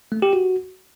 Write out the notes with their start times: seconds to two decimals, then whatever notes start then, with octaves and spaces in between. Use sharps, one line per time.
0.12 A3
0.22 G4
0.33 F#4